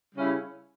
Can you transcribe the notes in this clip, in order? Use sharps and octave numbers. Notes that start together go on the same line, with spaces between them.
C#3 G3 C#4 E4